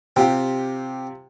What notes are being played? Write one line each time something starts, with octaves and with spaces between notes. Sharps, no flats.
C3 C4 F4 G4